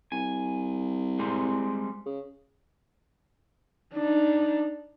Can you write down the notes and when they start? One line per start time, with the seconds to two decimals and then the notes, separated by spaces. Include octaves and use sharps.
0.12 C2 G#5
1.19 G3 G#3 C4
2.05 C#3
3.95 D4 D#4